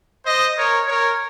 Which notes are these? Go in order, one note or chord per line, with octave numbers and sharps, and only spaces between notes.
C5 D#5
A#4 C#5
A#4 C#5